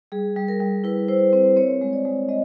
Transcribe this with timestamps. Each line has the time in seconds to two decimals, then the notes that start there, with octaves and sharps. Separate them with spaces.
0.12 G3 G#4
0.36 G3
0.48 A#4
0.61 G3
0.84 E4 B4
1.08 E4 C5
1.33 C4 C5
1.56 C4 C#5
1.81 G#3
1.93 D5
2.05 G#3
2.29 G#3 D#5